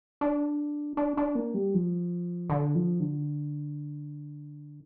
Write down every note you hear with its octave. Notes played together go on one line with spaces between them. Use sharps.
D4
D4
D4
A#3
G3
F3
D3
F3
D3